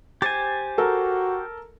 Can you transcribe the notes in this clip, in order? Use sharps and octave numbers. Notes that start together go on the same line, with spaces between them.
G4 C5 G#5 A6
F#4 A4 A#4